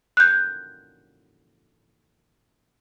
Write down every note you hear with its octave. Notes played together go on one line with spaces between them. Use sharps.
F#6 G6